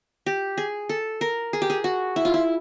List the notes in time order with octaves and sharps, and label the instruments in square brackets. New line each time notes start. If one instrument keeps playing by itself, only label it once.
[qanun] G4
G#4
A4
A#4
G#4
G4
G#4
F#4
E4
F4
E4